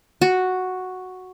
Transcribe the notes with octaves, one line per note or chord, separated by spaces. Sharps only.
F#4